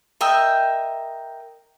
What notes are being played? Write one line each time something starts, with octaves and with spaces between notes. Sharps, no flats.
A#4 D#5 E5 G5